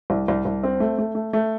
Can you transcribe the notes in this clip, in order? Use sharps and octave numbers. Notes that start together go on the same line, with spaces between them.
C2
C2
C2
C4
A3
A3
A3
A3